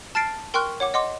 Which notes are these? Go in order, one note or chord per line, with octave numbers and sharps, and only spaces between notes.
A5 F6 A6 C7 D7
A#4 G5 C6 C#6 F6 F#6
C#5 F#5 D6
D#5 F#5 C6 D6